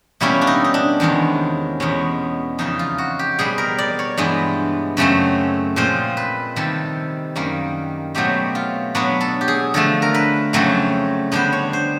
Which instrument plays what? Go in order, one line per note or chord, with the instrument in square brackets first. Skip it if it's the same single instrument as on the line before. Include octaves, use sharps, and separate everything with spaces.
[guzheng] B2 G3 A#3 C#4 E4
D4
D#4
D#4
D4
E2 C3 D#3 G#3 C#4
E2 B2 G#3 C#4
F2 C#3 E3 D#4
F4
F#4
G4
B2 G3 C4 G#4
A#4
D5
C#5
G2 E3 G#3 B3
F#2 C#3 F#3 A3 C4
A#2 F3 G#3 C4 C5
B4
C3 D#3 G3 A4
F#2 D#3 G3 A#3
B2 F#3 A3 C4 G4
F4
B2 F#3 B3 D4 B4
A4
G4
G#4
D3 F3 A3 A4
A#4
B4
F2 C#3 F#3 A3 C4
D3 G3 B3 D4 C5
C#5
C5